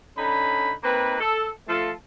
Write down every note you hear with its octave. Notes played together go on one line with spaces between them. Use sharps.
D3 C#4 D#4 B5
A#3 C4 D#4 B4
A4
F3 A3 F4 A4 A5